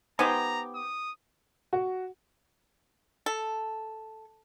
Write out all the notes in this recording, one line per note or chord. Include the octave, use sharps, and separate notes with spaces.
B3 D#4 G4 C5 G#5 A#5
D#6
F#4
A4